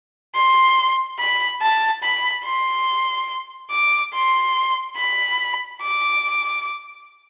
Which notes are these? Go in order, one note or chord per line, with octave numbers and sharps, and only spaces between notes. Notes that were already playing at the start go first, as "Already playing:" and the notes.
C6
B5
A5
B5
C6
D6
C6
B5
D6